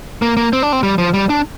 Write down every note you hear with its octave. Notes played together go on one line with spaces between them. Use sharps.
A#3
A#3
C4
D4
C4
G3
F3
G3
D4